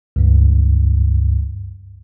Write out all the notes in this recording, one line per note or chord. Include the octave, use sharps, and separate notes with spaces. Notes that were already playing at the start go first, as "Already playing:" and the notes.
C#2 G2